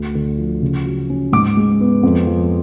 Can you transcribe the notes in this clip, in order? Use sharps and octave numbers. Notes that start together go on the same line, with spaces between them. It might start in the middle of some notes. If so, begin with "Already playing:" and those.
Already playing: D2
D3
F3
C#3
F#3
C#4
G#2 D6
G#3
B3
F2
F3